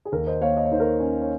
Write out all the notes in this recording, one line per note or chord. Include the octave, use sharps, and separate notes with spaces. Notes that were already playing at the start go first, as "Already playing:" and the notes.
G#4
D#2 A#4
C5 D#5
A#3 C#5 F5
D#5
C#5
D#3 C5
A#4 C#5
C#4
C#5